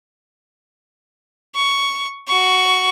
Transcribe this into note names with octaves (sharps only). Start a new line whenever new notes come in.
C#6
F#4 C#6